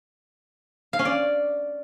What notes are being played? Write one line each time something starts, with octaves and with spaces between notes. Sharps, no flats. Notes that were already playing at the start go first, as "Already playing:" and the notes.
F5
C#4
D5